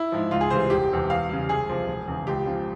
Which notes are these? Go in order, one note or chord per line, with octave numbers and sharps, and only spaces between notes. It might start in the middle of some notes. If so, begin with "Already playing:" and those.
Already playing: E4
G#2 F3
C#2 F4
G#4
C3 E3 G3 C5
E1 G4
E2 C3
E2 F5
C#3 G3
C2 G#4
C3 F3
E1
E2 C#3
C#2 G4
C#3 F3